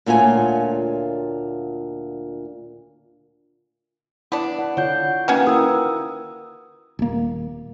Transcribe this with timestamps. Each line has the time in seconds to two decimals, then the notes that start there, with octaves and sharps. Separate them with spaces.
0.06 D2 A#2 F4 C#5 G#5
4.32 B3 D4 E4
4.59 F#5
4.77 D3 F4 C#5 F#5 G6
5.28 D#3 A#3 C#4 F#4 B4 F5 F#5 G#5
5.47 E4 A#4 B4 D#6 E6
6.99 D#1 A#3